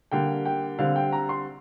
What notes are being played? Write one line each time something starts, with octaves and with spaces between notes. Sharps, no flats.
D3 G3 A#3 G5
G5
D3 G3 C4 F5
G5
A#5
C6